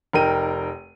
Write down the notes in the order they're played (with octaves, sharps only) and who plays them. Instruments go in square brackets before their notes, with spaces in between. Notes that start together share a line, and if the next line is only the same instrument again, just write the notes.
[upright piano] F1 D#4 A#4 G5 D#7